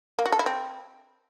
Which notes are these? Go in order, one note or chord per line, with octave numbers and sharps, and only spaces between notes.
A#3
F#4
A4
E4
C4